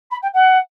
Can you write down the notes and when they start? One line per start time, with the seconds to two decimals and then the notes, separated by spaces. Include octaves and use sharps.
0.11 B5
0.22 G5
0.33 F#5